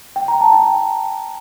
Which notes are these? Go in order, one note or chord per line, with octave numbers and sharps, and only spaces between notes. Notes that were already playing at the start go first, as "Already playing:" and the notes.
G5
A#5
A5
G5